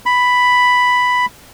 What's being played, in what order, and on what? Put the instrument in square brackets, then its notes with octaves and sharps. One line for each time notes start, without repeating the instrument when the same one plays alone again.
[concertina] B5